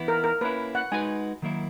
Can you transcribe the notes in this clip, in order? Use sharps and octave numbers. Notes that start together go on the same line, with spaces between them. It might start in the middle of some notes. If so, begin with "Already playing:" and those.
Already playing: E3 B3 E4
A#4
A#4
A#3 C#4 E4 B4
F#5
G#3 D#4 F#4 B4 G#5
D#3 F#3 A#3 E4